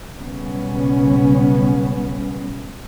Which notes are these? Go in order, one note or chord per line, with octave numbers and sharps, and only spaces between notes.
B1 C#3 G3 B3 C#4